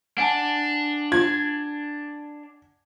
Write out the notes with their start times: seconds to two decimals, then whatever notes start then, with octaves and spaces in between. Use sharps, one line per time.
0.18 D4 F#5 G#5 A5
1.12 F4 G#6